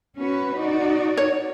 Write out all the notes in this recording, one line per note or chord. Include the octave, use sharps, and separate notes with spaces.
C#4 F#4 B4
D#4 F#4 D5
C#5